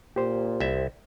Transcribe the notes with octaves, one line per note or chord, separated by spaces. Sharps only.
A#2 G4 C5
C2 E5